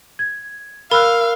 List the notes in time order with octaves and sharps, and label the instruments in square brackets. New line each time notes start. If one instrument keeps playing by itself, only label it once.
[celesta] G#6
[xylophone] A#4 [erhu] F5 [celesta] B5 E6 F#6